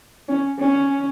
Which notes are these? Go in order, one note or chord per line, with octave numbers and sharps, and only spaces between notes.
C#4
C#4